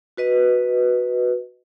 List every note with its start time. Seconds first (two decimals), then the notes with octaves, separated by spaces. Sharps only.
0.17 F#4 B4 D#5